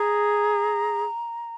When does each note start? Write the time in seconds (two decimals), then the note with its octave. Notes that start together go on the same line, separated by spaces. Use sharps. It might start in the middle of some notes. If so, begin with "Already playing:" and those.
Already playing: G#4 A#5